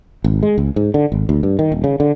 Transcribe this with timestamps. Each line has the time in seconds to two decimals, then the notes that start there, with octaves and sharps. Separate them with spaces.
0.24 G#1
0.43 G#3
0.58 C#2
0.76 G#2
0.94 D3
1.12 G#1
1.29 D2
1.43 G2
1.59 D#3
1.72 D#1
1.84 C#3
2.00 D3